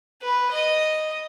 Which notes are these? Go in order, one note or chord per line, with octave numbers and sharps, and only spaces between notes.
B4
D#5